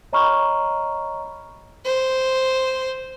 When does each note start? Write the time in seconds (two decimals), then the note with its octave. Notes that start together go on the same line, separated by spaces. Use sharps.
0.13 C#5 D#5 A#5 B5 C#6 F6
1.85 C5